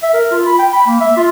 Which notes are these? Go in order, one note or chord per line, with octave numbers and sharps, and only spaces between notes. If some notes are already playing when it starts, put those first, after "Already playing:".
E5
A#4
F4
B5
G5
B5
A#3
E5
F4